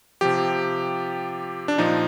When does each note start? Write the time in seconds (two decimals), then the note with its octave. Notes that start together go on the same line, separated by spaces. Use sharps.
0.21 C3 F3 G4
1.68 D4
1.78 A#2 F3 D#4